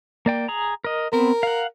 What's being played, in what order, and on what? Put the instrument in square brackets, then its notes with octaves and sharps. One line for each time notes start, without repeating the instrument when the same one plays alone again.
[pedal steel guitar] A#3 D5 G5
G#4 A#5
A#4 D#5
[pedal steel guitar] B3 C4 [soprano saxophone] A#4
[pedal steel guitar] F5 F#5